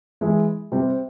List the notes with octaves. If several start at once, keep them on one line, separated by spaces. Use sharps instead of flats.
E3 G#3 E4 G#4
C3 G3 C4